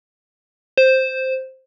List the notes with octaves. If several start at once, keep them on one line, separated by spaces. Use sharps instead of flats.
C5